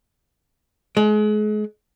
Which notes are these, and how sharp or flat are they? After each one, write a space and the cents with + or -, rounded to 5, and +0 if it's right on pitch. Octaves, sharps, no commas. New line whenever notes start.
G#3 +35